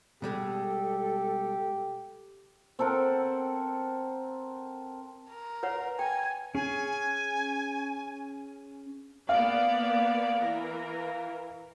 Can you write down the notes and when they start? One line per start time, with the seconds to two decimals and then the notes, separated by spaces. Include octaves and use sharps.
0.22 B2 G3 G#3 G4 A4
2.79 C4 A4 A#4 F#5
5.31 A#4
5.63 B4 C#5 F#5
5.99 G5 G#5
6.55 C#4 G#4 G#5
9.29 A#3 B3 D5 F5
10.39 E3 A#4